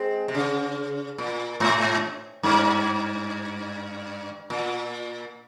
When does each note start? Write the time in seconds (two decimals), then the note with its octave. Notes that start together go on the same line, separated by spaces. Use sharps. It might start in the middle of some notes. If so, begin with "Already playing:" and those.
Already playing: G#3 C4
0.28 C3
0.35 C#3
1.18 A#2
1.60 G#2
2.43 G2
4.50 A#2